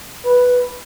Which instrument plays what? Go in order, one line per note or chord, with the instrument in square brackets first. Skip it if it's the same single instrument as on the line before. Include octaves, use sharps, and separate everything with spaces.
[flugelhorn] B4